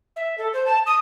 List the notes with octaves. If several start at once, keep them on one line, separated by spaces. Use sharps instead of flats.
E5
A4
C5
A5
D#6